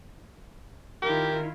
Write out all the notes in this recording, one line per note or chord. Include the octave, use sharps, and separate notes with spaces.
D#3 E4 F4 G4 A#4